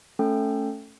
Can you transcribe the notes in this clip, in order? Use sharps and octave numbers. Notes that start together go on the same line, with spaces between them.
A3 C#4 A4 G5